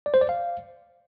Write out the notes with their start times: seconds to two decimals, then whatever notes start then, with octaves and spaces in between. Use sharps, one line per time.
0.06 D5
0.14 C5
0.21 D5
0.29 F5